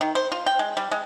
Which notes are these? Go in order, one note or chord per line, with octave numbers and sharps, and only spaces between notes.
D#3
C5
F4
G5
G#3
G3
G#3